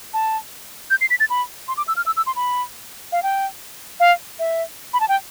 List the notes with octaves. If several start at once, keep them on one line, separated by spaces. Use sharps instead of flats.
A5
G6
C7
B6
A6
B5
C6
D6
E6
F6
E6
E6
C6
B5
F5
G5
F5
E5
B5
A5
G5